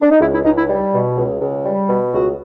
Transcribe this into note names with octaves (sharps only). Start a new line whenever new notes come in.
D4
D#4
C#2 E4
E4
C#2 D#4
E4
G3
B2
C#2
C#2
G3
B2
C#2 F#4